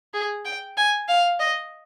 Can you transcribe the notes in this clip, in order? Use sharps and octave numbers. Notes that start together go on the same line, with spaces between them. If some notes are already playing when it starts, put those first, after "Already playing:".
G#4
G5
G#5
F5
D#5